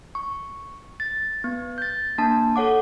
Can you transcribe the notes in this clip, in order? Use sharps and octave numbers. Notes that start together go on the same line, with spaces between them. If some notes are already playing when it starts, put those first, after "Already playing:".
C#6
A6
B3
G6 A6
A#3 D4 A5
A4 C#5 F#5 D6